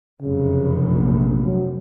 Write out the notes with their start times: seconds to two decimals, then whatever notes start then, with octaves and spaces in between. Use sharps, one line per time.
0.22 F1 F#2 C#3
0.91 A#1
1.44 F#3